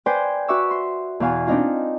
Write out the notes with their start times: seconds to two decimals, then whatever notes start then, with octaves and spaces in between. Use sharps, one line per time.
0.06 B4 C5 D5 G5 G#5
0.48 F#4 B4 E5 C#6 D6 E6
0.71 C6
1.20 E2 B2 F5 G#5
1.47 C4 D4 D#4 F4